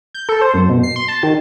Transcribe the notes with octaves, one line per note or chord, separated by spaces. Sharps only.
G6
A4
C5
F#2
B2
C7
C6
A5
D#3